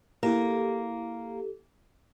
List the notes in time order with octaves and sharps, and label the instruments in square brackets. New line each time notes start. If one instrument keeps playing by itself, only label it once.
[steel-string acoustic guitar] A#3 [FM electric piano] E4 G4 A4